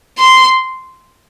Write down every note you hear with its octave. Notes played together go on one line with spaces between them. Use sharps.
C6